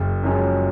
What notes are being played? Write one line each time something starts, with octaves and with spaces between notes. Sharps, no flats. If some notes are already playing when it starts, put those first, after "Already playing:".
Already playing: F#1
F#2 F3 G#3 C#4